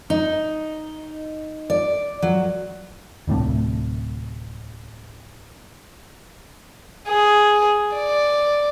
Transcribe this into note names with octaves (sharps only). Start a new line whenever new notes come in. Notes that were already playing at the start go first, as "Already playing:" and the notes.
D#4
D5
F#3
D1 A2 C3 A3
G#4
D5